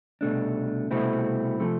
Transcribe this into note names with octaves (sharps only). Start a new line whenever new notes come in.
C2 B2 A3 D4
C2 B2 A3 C4 E4
C3 F3 A3